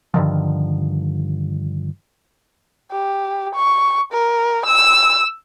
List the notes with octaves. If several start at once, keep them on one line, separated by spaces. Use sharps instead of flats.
G2 D3 D#3 F3
G4
C#6
A#4
E6